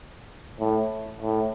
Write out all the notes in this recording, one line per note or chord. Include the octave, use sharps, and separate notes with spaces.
A2
A2